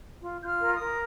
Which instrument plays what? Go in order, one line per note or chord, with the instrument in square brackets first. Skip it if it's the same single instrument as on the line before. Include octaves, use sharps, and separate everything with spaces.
[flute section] F4
F4 G6
F6
A#4
D#6
A#4